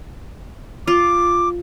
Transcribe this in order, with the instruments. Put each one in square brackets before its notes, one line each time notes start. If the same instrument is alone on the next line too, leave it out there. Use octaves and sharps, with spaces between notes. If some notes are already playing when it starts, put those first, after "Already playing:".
[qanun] F4 [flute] D6